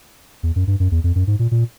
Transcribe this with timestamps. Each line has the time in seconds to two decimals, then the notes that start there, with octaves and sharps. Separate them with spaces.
0.43 E2
0.56 F#2
0.67 G2
0.80 F#2
0.91 E2
1.04 F2
1.15 F#2
1.27 G#2
1.39 A#2
1.51 A#2